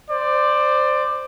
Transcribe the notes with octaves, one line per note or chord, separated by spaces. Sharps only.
C5 D5